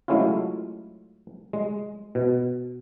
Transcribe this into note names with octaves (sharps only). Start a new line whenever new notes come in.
F#3 G#3 A3 C#4 E4 F4
G#3
B2